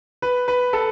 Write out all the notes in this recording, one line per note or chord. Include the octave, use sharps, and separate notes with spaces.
B4
B4
A4